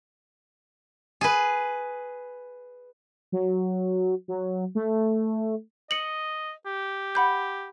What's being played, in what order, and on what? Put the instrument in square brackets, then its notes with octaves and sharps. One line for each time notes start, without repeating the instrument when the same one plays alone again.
[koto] G#4 B4
[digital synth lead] F#3
F#3
A3
[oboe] D#5 [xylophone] C#7 F#7
[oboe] G4
[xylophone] F#5 B5 G6